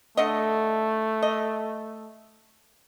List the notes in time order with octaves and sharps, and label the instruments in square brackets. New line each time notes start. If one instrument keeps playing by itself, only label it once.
[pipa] D3 D#5 [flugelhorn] A3
[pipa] D#5